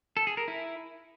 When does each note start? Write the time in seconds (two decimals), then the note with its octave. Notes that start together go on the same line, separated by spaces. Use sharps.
0.17 A4
0.27 G#4
0.37 A#4
0.48 E4